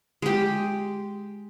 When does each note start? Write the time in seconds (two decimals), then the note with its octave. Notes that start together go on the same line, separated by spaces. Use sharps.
0.22 G#3 G4